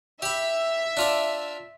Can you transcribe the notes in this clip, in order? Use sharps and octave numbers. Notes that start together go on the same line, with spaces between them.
G4 E5 B5
D4 F4 D5